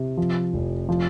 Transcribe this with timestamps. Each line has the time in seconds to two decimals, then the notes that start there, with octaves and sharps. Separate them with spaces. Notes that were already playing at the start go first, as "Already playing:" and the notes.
Already playing: C3
0.17 F3
0.54 F1
0.89 F3